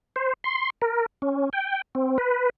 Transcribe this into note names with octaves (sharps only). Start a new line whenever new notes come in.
C5
C6
A#4
C#4
G5
C4
B4